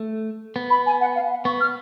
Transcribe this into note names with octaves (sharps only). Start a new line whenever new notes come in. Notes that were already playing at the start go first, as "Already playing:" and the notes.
Already playing: A3
B3
B5
G#5
F#5
F5
F#5
B3 C#6
F6